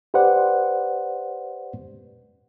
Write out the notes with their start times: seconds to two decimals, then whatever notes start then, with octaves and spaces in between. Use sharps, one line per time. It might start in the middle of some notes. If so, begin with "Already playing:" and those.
0.14 G4 B4 C5 D5 F#5